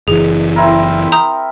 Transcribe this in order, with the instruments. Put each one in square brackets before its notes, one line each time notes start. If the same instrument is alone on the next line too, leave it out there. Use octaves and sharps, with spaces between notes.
[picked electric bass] F#1 E3 [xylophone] G#4
[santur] C4 E4 A#4
[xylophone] A#5 D#6 G6